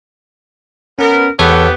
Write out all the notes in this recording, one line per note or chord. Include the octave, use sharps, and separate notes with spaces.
B3 C#4 A#4
E2 G#2 B3 G4 A4 C#5